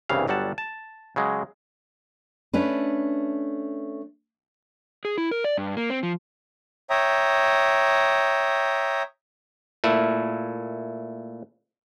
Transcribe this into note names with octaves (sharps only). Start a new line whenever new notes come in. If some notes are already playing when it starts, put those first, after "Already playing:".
C2 G2 C#3 E3 F5
G1 F#3 G3 F#5 A5
A5
C#3 F#3 G#3
A3 C#4 D4 B4
G#4
E4
A#4
D5
G2
A#3
C4
F3
C#5 E5 G5 A#5 D#6
A#2 A3 E4